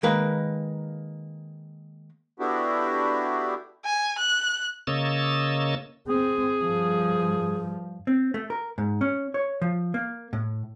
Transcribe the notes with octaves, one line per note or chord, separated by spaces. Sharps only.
D#3 G#3 A#3 A#4 B4
A3 B3 D4 E4 F#4 G4
G#5
F#6
C#3 A#3 C#5 D#5 E6 A6
C4 G#4
G2 F3
C4
A3
A#4
G#2
C#4
C#5
F3
A#3
A2